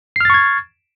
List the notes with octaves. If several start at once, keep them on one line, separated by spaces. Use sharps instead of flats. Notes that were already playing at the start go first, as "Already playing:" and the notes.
C#6 F6 G#6 A6 C7